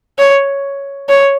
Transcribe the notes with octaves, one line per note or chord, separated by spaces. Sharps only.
C#5
C#5